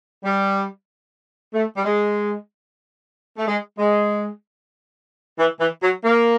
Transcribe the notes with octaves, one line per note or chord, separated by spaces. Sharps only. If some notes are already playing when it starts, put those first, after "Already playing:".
G3
A3
G3
G#3
A3
G#3
G#3
E3
E3
F#3
A#3